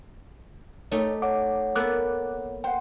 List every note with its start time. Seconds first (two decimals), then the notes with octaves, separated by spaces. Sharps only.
0.92 A3 D#4 G4 C#5
1.22 C#5 F#5 D6
1.75 A#3 B3 A4 D6 F#6
2.64 C5 F#5 G5